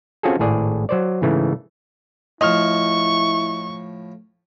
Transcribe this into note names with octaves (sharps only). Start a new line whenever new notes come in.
C4 C#4 F4 F#4 G#4 A4
G#1 A2 G#4 D5
F#3 C5 D5
G#2 C#3 E3 A3
A2 F3 E4 D#5 C#6 F6